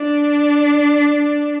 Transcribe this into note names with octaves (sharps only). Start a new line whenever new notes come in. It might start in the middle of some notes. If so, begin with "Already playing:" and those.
Already playing: D4